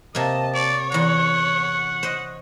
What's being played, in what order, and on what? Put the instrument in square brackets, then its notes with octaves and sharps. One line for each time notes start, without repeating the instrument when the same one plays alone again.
[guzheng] C3 A#3 [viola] D#5 A5
[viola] C#5 [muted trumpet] D5
[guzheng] E2 A#5 [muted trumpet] F#5
[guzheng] C5 D#5